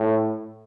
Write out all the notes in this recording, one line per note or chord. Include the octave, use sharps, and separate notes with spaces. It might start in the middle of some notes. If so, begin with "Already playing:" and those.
Already playing: A2